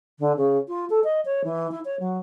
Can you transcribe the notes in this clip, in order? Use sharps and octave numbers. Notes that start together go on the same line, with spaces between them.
D3
C#3
F4
A4
D#5
C#5
E3
E4
C#5
F#3